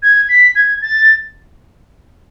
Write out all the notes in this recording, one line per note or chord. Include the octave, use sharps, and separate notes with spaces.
G#6
B6
G#6
A6